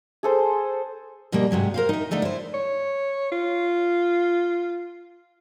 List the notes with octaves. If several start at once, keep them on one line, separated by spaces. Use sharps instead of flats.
G#4 A4 C5
B2 G3 G#3 A#3
G#2 C3 F#3 G4
A#4 C5 F5
D#4 E5
D3 A3 D#4 A4
E4 C5
C#5
F4